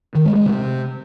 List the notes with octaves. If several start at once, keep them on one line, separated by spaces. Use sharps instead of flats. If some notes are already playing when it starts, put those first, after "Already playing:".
D#3
G#3
G#3
C3